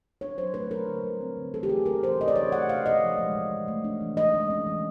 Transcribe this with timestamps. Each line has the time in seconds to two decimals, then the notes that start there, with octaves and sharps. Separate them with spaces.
0.21 D4 C#5
0.38 F#3 C5
0.54 A3 B4
0.70 A#2 A#4
0.88 D3
1.04 G3
1.21 C4
1.37 D3
1.54 E3 A4
1.63 G4
1.69 A3 G#4
1.86 C#4 A#4
2.02 E3 C5
2.20 C3 D#5
2.28 D5
2.36 E3 C#5
2.52 A3 F#5
2.69 C3 F5
2.86 A#2 D#5
3.02 F3
3.18 G#3
3.35 A#2
3.51 E3
3.68 A3
3.84 D4
4.01 E3
4.17 E3 D#5
4.34 G#3
4.50 C#4
4.67 E3